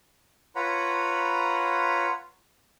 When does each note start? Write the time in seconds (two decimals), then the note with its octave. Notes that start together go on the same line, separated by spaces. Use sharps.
0.56 F4 B4 C#5 F#5 A#5 B5